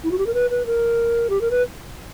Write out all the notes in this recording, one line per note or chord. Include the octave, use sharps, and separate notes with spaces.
E4
F#4
G4
A#4
B4
B4
A#4
G4
A#4
B4